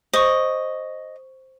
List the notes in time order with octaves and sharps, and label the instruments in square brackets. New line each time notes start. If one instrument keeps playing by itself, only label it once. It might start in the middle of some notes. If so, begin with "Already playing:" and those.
[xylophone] C5 C#6 [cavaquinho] D#5